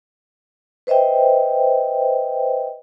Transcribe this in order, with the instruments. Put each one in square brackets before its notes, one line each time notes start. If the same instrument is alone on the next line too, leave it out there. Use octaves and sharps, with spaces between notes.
[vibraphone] B4 C5 D#5 E5 G5